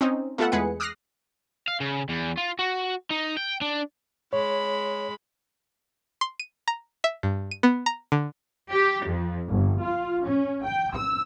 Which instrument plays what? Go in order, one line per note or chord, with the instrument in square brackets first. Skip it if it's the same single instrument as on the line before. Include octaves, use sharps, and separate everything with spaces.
[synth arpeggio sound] C4 C#4 D#4
A3 B3 F4 A4 E5 F#5
E2 G#3 G#4 B4 F#5 C#7
D6 D#6 F6 F#6 A#6 C7
[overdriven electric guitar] F5
C#3
E2
F4
F#4
D#4
G5
D4
[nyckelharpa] G#3 B5 [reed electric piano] C#5
[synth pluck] C6
D#7
A#5
E5
G2
D#7
B3
A#5
D3
[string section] G4
F2
G1
F4
C#4
G5
E6